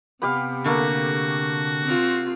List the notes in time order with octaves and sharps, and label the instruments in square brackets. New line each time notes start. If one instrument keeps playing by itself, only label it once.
[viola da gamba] C3 [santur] B3 G4 F5
[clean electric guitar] D3 [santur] A3 A#3 [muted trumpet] F#4
[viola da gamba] C4 F4